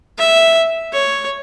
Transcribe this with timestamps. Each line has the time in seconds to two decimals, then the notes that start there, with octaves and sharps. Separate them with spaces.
0.18 E5
0.93 C#5